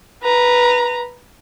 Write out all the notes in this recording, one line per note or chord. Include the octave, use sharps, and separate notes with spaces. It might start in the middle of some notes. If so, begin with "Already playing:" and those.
B4 A#5